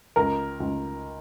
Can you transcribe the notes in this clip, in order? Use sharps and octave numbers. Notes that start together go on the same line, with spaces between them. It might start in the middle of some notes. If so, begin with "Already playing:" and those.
C#2 A#4
C#2